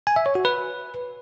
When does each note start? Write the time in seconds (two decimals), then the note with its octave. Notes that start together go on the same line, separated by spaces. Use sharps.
0.07 G#5
0.16 E5
0.26 C#5
0.35 F#4
0.45 B4